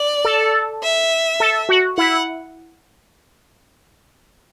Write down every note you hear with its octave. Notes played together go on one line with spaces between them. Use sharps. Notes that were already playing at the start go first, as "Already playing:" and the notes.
Already playing: D5
A4
E5
A4
F#4
E4 F#5